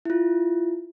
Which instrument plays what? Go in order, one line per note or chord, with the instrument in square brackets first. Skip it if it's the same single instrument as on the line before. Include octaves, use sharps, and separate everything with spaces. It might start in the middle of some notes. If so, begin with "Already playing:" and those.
[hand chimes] E4 F4